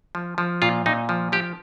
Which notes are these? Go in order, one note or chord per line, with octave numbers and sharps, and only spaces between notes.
F3
F3
A#2 F4
A#2 D#4
F3
F3 G4